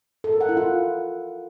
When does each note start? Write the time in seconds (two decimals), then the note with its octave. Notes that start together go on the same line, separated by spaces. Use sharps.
0.24 A4
0.32 A#4
0.41 F#5
0.49 E4
0.57 F4